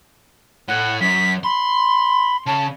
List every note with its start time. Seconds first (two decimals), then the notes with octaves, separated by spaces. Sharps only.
0.68 A2 F#5
1.01 F#2 B6
1.44 B5 C6
2.46 C#3 A5